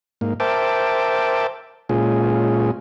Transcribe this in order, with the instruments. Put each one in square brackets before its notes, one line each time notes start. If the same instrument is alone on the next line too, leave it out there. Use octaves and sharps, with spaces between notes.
[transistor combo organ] G#2 A#3
A#4 C5 E5 G5 A5 D6
A#2 G#3 C#4 F4 G#4